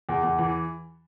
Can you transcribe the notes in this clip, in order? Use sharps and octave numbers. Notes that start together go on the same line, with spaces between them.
E2
E2
E3